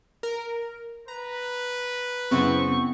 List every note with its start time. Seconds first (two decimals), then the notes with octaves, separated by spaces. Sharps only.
0.23 A#4
1.08 B4 A#5
2.31 F#2 C#3 B3 C4 E4 F#5 C#6